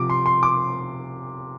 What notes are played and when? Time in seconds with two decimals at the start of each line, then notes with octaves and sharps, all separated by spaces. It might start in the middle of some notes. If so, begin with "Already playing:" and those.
Already playing: C3 F3 D6
0.10 C6
0.26 C6
0.43 D6